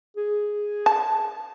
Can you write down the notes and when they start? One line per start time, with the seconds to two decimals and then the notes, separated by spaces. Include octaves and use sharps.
0.16 G#4
0.86 A5